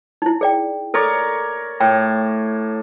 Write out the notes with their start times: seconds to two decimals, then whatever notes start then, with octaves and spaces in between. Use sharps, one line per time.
0.22 D#4 E4
0.41 G#4 D5 G5
0.94 A4 A#4 C#5 D5
1.80 A2 G5